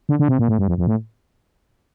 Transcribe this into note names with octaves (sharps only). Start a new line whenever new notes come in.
D3
D3
C3
A#2
A2
G2
F2
F2
A2